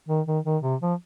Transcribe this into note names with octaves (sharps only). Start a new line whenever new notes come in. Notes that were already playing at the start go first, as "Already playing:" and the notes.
D#3
D#3
D#3
C3
F3